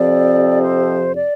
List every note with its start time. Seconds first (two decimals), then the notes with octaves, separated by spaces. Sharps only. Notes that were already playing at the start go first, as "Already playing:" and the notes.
Already playing: F2 C3 F3 C4 D5
0.63 C5
1.16 D5